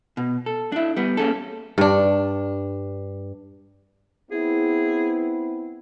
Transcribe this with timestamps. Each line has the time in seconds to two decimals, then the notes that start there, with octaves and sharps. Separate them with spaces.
0.17 B2
0.46 A4
0.72 D4 E4
0.96 G3 B3
1.17 A#3 C#4 D4 G#4 A4
1.78 G2 D4
4.31 B3 C4 E4 G#4